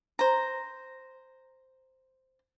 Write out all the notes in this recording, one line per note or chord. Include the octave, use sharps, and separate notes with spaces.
C5 A#5